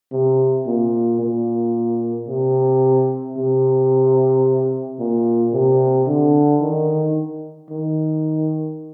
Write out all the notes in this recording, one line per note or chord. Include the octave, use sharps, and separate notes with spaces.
C3
A#2
A#2
C3
C3
A#2
C3
D3
D#3
D#3